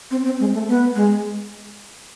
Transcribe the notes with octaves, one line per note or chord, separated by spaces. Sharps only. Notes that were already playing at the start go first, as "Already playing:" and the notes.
C4
C4
G#3
A3
B3
G#3